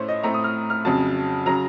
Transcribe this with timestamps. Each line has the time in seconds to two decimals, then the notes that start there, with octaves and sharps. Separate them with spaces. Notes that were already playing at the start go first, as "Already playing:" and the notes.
Already playing: A2 A3 C#4 C5 C#5
0.09 D#5
0.23 A2 A3 C4 A#5
0.34 D#6
0.44 F6
0.70 F6
0.85 F2 C#3 F#3 A5
1.46 C#3 F#3 A#5